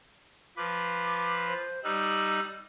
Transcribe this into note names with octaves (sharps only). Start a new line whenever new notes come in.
F3 B4 D6
C5
G3 D#4 E6 F#6